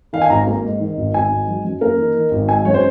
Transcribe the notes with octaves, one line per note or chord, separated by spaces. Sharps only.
D#3 F5
G#5
G#1 A#5
A#3
G#2
D#3
G#1
G#1 G#5
G#2
F#3
F#2
A#3 A#4
D#3
D#3
G#1
G#3 G#5
F#2 C#5
C5